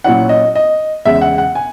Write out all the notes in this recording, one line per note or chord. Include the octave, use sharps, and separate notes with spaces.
A#2 F#3 C#4 E4 F#5
D#5
D#5
E2 C#3 G#3 E5
F#5
F#5
G#5